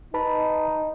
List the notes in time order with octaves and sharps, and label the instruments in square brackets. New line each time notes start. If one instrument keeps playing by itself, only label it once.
[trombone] D#4 [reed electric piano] B4 A5 B5